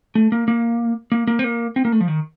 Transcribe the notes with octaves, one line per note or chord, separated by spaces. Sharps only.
A3
A#3
A#3
A#3
A#3
C4
A#3
C4
A#3
A3
F3
D#3